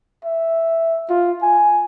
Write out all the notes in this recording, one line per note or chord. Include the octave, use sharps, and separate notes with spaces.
E5
F4
G#5